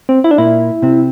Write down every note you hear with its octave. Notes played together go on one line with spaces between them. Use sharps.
C4
E4
D4
A#2 A#3 E4
C3 C4